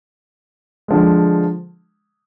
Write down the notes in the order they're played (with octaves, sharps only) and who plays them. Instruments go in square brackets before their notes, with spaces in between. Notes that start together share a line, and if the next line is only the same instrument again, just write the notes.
[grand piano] D3 F3 G#3